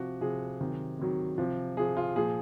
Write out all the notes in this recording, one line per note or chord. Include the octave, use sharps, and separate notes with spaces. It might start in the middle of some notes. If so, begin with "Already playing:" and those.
Already playing: C3 F3 F#4
C3 F3 G#4
C3 D#3 F#3
C3 D#3 F#3
C3 F3
C3 F3 G#4
F4
A#2 F3 G#4